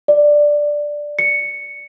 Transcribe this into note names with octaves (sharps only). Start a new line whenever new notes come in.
D5
C#7